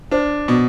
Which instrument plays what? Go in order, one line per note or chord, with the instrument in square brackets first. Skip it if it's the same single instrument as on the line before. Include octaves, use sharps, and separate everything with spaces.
[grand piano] D4 [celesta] C5
[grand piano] B2